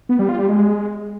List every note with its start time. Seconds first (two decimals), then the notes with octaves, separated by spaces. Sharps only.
0.09 B3
0.19 G3
0.29 F4
0.39 G3
0.49 G#3